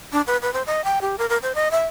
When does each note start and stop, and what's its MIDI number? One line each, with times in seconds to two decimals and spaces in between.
0.13 0.21 62
0.27 0.37 71
0.42 0.53 71
0.53 0.62 72
0.67 0.84 75
0.84 0.99 79
1.01 1.16 67
1.18 1.26 70
1.29 1.38 70
1.43 1.53 72
1.55 1.69 75
1.71 1.86 76